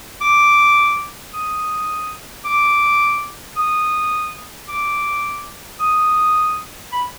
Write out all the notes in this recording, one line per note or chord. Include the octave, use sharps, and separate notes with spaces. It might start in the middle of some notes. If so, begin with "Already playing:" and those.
D6
D#6
D6
D#6
D6
D#6
B5